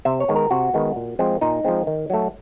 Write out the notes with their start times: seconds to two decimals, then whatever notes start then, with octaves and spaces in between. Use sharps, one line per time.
0.05 C3 E5
0.20 C#5
0.28 D#3 G#3 B3
0.36 A#4
0.51 C3 F#4
0.74 D#3 G#3 B3
0.96 A#2
1.19 F3 G#3 C4
1.41 A#2 D#4
1.64 F3 G#3 C4
1.87 D#3
2.10 F#3 A3